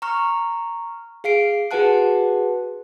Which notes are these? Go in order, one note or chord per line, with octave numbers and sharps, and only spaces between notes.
A#5 C#6 F6
G#4 F5 C7 D7
F#4 G#4 B4 F#5 A5 F#6